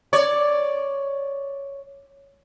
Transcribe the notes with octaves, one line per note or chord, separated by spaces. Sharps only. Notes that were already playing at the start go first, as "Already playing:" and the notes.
C#5 D5